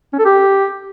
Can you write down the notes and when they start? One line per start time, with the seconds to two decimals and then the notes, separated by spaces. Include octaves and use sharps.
0.13 C#4
0.19 A4
0.25 G4